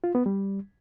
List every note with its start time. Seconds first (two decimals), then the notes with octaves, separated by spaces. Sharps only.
0.04 F4
0.15 B3
0.26 G3